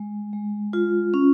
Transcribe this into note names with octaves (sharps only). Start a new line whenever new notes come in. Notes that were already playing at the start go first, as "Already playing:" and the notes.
Already playing: G#3
G#3
F4
C#4